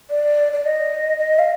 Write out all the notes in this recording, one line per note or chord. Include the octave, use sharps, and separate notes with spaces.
D5
D5
D#5
D#5
F5